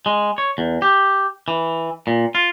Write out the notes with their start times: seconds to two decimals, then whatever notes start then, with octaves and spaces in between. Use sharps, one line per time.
0.06 G#3
0.38 C#5
0.58 E2
0.82 G4
1.48 E3
2.07 A#2
2.35 F4